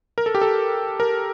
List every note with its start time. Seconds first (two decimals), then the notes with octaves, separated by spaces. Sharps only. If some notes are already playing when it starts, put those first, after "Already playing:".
0.18 A#4
0.26 A4
0.35 G4
0.41 A4
1.00 A#4